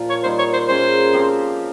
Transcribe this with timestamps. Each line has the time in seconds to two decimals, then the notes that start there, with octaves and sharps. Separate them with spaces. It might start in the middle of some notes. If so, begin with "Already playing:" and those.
Already playing: A#2 F3 F4
0.10 C#5
0.23 G3 A#3 D#4 C5
0.39 C#5
0.54 C5
0.68 A#3 C#4 G#4 C5
1.13 F3 C4 G4